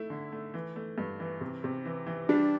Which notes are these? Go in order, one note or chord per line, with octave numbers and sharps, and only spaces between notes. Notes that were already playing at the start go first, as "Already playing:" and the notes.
Already playing: A3 E4
D3
A3
E3
A3
G2
E3
C3
C3
E3
E3
G3 D4